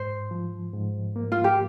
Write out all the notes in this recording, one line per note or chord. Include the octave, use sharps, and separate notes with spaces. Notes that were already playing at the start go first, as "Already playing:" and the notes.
Already playing: G#2 C5
F3
G#2
A#3
F4
G4